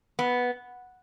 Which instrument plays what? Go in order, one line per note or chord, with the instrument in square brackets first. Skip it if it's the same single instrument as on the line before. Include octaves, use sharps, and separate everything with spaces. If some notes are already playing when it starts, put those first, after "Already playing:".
[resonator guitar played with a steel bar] B3